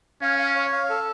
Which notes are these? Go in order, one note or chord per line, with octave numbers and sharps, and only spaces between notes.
C#4 F5
F5
C#5
F5
A4